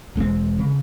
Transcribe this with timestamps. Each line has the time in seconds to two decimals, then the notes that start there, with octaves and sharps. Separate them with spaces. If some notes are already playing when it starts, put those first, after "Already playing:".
0.16 E1 G#3 A#3 C4
0.59 C#3